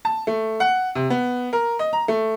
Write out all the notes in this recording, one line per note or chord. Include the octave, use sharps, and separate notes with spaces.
A5
A3
F#5
C3
B3
A#4
D#5
A#5
A3